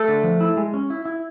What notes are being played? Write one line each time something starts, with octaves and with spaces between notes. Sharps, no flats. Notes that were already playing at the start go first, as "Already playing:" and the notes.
Already playing: A3 A4
D3
F3
E4
G#3
C#4
E4
E4